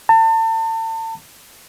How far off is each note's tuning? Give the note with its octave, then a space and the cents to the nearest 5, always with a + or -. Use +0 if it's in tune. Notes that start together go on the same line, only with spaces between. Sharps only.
A5 +35